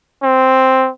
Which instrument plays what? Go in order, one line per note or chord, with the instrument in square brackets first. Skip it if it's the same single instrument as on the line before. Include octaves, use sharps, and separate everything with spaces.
[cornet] C4